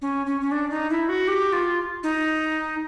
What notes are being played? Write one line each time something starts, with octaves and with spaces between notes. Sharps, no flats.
C#4
C#4
C#4
D4
D#4
E4
F#4
G4
F4
D#4